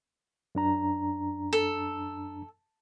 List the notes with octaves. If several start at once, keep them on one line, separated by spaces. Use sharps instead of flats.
F#2 D4 A#5
A4